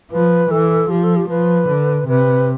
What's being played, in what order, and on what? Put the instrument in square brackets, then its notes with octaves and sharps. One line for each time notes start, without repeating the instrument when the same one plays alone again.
[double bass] F3 [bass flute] B4
[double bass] E3 [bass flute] A4
[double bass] F3 [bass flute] G4
[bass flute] A4
G4
[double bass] F3 [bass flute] B4
[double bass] D3
[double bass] C3 [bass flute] B4